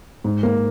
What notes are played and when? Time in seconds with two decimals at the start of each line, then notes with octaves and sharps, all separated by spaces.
0.24 G#2
0.43 A#3